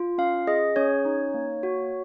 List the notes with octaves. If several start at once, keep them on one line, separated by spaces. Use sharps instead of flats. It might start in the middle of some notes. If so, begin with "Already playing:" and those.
Already playing: F4
C#4 F5
G#4 D#5
C#4 C#5
D#4
A#3
F#4